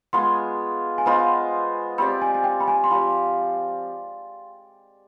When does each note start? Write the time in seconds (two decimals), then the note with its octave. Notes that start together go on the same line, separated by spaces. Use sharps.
0.13 G#3 B3 F4 G#4 C6
0.98 G#5
1.06 B3 F4 C5 D#5 B5
1.98 C4 G4 D5 B5
2.22 G#5
2.35 G#5
2.44 G5
2.60 B5
2.68 G#5
2.84 C6
2.90 F3 C4 G4 D5 B5